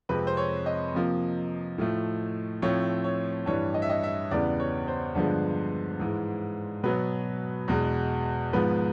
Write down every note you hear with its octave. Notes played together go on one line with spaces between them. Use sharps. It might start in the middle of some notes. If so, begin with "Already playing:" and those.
F2 C3 F3 G#3 C4 B4
C5
C#5
D#5
C3 F3 A#3
A2 F3 A3
A2 F3 A3 C4 C#5
C#5
G2 E3 G3 C#5
D#5
E5
D#5
E5
E2 C#3 E3 G3 B3 D5
C#5
C5
G2 D3 F3 G#3 B3
G#2 E3 G#3
B2 F#3 B3 B4
E2 B2 G#3
G#2 F3 G#3 B3 B4